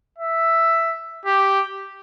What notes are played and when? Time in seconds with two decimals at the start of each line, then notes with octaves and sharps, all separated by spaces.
0.18 E5
1.26 G4